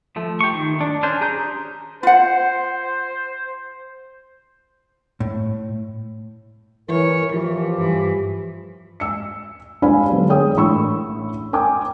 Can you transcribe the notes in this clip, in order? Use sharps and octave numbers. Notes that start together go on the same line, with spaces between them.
F3 A3
G4 C#6
D#3
D4
C#4 D4 C5
G4 G#4 A#5 G6
F4 C5 F#5
A2
E3 A#4 C#5
E3 F3 G4
G2 E3
E6 C#7
D4 G4 C5 F5 G#5 B5
D3 F#3 B3
G#4 A#4 C#5 G5 D#6
A1 A2 D4 B5 C#6 E6
A#4 G5 G#5 D6